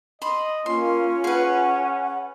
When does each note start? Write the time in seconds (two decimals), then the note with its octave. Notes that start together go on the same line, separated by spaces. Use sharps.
0.22 D#5 B5 C6
0.66 A#3 C#4 F4 C6
1.24 G#4 B4 F#5